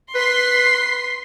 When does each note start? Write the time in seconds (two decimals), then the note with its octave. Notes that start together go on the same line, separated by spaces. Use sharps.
0.15 B4 C6 B6 C7